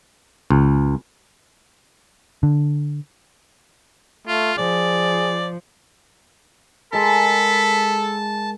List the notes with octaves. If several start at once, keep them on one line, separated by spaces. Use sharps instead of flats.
C#2
D3
A3 F4
F3 G#4 D5
G#3 A4 A#4 A5 B5